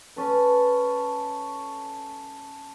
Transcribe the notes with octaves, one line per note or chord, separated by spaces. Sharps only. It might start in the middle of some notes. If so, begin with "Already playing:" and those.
C#4 A4 B4